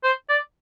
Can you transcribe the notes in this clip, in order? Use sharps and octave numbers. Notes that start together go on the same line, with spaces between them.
C5
D5